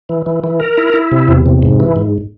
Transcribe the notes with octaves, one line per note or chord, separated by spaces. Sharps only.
E3
E3
E3
A#4
E4
E4
C3
E2
C3
G#2
E3
G#2